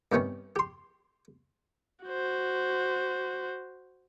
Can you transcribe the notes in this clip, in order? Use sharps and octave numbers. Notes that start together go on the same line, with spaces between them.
G2 C3 D#3 B3 C#4
G4 C6
F#4 C5